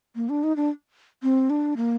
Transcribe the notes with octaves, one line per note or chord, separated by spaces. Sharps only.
A#3
D4
D#4
D4
C4
D4
A#3